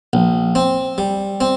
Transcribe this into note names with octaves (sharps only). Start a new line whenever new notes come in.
A#1
C4
G3
C4